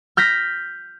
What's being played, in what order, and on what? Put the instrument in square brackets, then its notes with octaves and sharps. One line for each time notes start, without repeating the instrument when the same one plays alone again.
[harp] F6 G6 A#6 B6